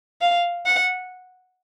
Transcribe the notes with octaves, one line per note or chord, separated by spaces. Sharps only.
F5
F#5